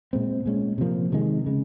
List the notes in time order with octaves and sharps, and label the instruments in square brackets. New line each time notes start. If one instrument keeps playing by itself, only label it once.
[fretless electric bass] A#2 G#3 C4
A#2 G#3 C#4
C3 F3 A#3
C3 D#3 G#3
C#3 G#3